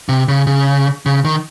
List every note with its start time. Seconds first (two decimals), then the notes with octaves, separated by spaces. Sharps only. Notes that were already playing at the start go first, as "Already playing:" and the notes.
0.09 C3
0.28 C#3
0.47 C#3
1.06 C#3
1.25 D#3